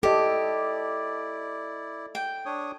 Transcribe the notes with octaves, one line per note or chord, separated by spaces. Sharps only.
E4 G4 A4 D5 D#5
G5
D4 C#5 D#6